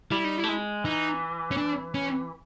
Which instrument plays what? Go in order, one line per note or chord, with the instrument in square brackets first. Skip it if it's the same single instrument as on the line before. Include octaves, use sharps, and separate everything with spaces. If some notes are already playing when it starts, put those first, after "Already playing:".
[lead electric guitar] G3 [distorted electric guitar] E4
[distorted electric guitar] D#4
E4
[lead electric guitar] A3
G#3
[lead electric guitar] E3 [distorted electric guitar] D#4
[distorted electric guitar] C#4
D4
C#4